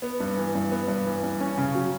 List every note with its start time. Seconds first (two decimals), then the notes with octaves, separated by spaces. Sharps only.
0.02 B3
0.20 G2
0.37 E3
0.55 G2
0.71 B3
0.88 G2
1.06 E3
1.23 G2
1.41 C#4
1.58 C#3
1.75 F#3